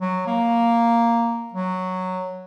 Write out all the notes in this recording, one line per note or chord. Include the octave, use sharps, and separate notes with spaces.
F#3
A#3
F#3